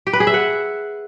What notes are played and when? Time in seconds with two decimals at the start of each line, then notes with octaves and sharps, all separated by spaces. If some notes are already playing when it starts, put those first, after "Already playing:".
0.07 G4
0.13 B4
0.20 G#4
0.27 E5
0.34 F#5